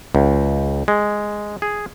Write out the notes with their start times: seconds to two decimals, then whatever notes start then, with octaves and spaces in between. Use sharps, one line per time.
0.15 C#2
0.88 G#3
1.62 G#4